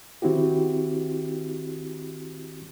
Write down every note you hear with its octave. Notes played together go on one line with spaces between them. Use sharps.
D#3 C4 E4 F#4 G4